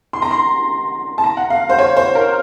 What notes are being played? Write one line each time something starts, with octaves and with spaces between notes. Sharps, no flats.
C6
A#5
C6
A5
A#5
F#5
F5
C5
C#5
C5
A#4